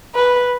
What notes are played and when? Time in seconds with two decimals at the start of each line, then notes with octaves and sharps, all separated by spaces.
0.15 B4